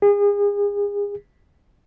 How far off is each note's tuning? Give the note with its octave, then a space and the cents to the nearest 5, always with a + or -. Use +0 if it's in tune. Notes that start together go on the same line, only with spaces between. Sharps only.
G#4 -35